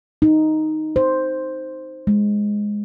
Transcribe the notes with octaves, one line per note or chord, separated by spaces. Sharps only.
D#4
C5
G#3